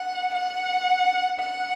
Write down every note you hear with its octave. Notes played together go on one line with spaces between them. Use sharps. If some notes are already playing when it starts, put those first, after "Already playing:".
Already playing: F#5
F#5
F#5